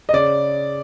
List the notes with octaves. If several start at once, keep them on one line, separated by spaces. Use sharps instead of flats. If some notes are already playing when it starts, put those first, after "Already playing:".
D#5
C#3 D5